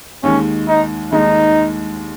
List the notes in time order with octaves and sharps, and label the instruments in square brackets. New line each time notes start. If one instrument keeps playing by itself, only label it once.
[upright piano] D#2 D#3 G#3 [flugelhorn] C#4
[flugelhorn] D#4
[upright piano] D#2 D#3 G#3 [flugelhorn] D#4